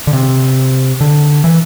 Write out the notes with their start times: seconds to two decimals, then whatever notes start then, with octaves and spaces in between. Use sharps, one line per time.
0.07 D3
0.13 C3
1.01 D3
1.44 E3